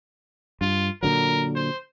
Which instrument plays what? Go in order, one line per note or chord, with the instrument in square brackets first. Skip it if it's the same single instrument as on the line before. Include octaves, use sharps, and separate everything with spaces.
[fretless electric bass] G2 [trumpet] F4
[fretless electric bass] A#2 D3 F#3 [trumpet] A#4
[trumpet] C5